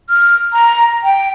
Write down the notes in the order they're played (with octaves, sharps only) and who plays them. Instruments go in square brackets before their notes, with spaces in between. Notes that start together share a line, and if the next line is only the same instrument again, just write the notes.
[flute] F6
A#5
G5